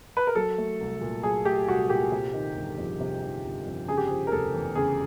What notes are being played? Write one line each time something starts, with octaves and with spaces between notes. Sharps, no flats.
B4
A#4
F#3 A4
A3
C2
A#2
F#3 G#4
A3 G4
C2 F#4
A#2 G4
C3
D#3
G1
F2
C3
D#3
G1
F2
C#3 G#4
G4
F3 G#4
A#4
F1 A4
E2
C#3 G#4